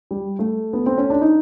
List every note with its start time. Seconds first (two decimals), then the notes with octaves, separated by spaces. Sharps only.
0.11 G3
0.39 A3
0.73 B3
0.86 C4
0.98 C#4
1.10 D4
1.21 D#4